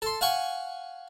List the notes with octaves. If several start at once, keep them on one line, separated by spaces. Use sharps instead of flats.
A4 C6
F5 F#5 G#5 C#6